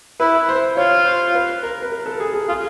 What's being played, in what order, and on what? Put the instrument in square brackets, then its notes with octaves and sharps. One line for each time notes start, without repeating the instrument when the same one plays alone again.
[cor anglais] E4 [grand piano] B4
[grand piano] C5
[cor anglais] F4 [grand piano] C#5
[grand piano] C5
B4
A#4
B4
A#4
A4
G#4
G#4
[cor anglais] F4 [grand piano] G#4